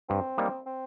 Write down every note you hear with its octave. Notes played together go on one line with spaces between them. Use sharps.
G2 C4
G3 A#3 D#4
C4